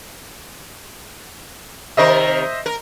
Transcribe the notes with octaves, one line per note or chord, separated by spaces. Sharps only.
C3 D#3 A#4 C5 D#5 E5
A#4